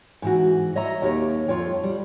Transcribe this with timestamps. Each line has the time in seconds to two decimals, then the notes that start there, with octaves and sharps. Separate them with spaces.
0.22 G#2 E3 F#4
0.76 C#5 D#5 E5 A#5
1.02 D#2 G4 C#5
1.48 F2 F4 C#5 G5
1.84 G3